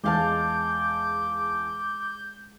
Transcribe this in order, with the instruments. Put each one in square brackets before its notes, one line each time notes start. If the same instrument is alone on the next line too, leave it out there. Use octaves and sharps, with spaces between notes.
[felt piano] E2 F5 A5 [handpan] G#3 [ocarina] D6 [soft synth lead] G6